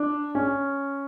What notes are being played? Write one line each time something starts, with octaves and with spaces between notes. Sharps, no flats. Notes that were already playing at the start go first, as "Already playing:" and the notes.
Already playing: D4
C#4